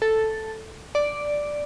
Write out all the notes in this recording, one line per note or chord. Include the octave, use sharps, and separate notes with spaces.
A4
D5